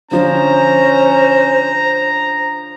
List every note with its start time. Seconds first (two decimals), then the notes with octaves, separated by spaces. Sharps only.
0.11 D3 F3 C#4 C5 A#5